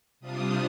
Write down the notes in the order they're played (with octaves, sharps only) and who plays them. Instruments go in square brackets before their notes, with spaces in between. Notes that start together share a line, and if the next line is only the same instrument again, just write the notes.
[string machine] C3 G3 D4 F4 D#6